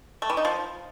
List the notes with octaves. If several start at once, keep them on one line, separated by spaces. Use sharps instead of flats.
A3
E3
D#4
F3